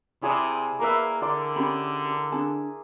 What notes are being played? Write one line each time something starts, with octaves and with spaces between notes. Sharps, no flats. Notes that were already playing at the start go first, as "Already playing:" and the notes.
C3 E4 G#4 D5
A#3 A#4 B4 E5
D3 D5 C6 D6
C#4 G4 B5
D4 D#4 G#4 A5